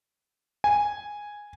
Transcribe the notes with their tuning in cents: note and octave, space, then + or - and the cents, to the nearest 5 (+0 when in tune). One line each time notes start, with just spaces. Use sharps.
G#5 -5